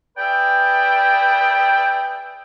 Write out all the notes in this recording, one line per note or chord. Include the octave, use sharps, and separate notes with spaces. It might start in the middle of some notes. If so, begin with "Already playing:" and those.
G#4 B4 D5 E5 G5